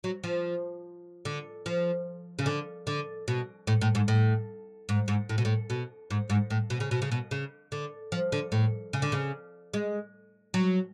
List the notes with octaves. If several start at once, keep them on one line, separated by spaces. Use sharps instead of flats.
F#3
F3
D3
F3
C#3
D3
D3
B2
A2
A2
G#2
A2
G#2
G#2
A2
B2
A2
B2
G#2
G#2
A2
B2
C#3
B2
C#3
B2
C#3
D3
F3
D3
A2
C#3
D3
C#3
G#3
F#3